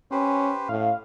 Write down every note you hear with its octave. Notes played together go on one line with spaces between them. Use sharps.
C#4 G4 B4 C5
A2 F5